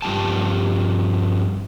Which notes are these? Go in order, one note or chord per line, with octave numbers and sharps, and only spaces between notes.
G2 F3 B3 G4 G5 A5